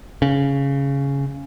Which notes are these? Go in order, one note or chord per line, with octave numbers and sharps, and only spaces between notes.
C#3